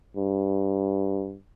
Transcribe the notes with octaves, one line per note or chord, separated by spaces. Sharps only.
G2